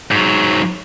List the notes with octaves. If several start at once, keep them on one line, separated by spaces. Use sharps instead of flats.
G#2 F#3